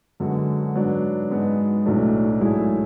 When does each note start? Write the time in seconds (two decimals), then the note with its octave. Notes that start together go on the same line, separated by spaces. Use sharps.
0.20 F#2 D3 G#3 B3 F#4
0.75 G#2 F#3 B3 D4
1.30 G#2 G#3 B3
1.86 B1 A2 F#3 A3 D4
2.41 G#2 F#3 A3 E4 G#4